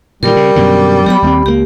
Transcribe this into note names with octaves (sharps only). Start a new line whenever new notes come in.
A#2 D3 D#3 G3 A#4
C#3
F#2 B2 D3
F#3 A#3 B3 G4 B5
D#2 A3 C4
C#2 G#3 A#3 G4